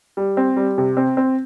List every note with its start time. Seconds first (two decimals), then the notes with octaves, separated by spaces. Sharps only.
0.17 G3
0.37 C4
0.56 G3
0.78 C3
0.97 C4
1.17 C4